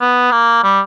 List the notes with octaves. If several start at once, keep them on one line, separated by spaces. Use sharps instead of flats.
B3
A#3
G3